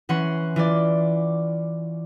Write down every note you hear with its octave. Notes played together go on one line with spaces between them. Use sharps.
E3 C#4 F#5 C6
E3 F4 D5